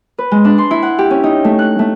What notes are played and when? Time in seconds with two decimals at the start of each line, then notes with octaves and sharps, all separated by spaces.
0.18 B4
0.31 G#3
0.45 D4
0.58 C6
0.71 E4
0.82 F#5
0.98 G4
1.10 C#4
1.23 D#4
1.44 A3
1.59 F#6
1.79 A3